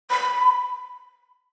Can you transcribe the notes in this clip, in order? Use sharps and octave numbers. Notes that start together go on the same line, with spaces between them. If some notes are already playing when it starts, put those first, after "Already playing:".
B5